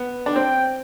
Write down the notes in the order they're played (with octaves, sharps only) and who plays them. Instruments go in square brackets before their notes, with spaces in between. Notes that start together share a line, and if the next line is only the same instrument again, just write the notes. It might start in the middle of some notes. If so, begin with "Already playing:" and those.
Already playing: [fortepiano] B3
D4
[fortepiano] C4 [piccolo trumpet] G5